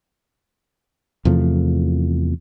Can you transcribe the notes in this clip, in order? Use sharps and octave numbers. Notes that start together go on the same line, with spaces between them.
E2 C3 F3 A3